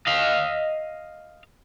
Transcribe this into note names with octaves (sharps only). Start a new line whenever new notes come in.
D#5 F5